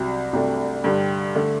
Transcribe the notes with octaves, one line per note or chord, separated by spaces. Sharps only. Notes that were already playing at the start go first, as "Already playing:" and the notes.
Already playing: C2 C3 F#3
C2 C3 F#3 A3 D4
G2 D3 G3
D3 A3